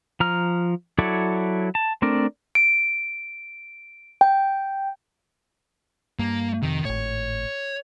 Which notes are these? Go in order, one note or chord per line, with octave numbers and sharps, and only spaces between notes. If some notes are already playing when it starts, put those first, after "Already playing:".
F3 A#5 F6
F#3 E4 A4 C#5 D5
A5
A3 C4 D4 A#4 D5
D7
G5
G2 A#3
F2 C3 D#3
G#1 A2 C#5